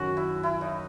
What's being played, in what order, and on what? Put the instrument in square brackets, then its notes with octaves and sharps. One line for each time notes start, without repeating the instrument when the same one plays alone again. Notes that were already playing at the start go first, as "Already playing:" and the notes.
Already playing: [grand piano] F#2 D#3 F#3 [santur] F#4
[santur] E4
E4
D#4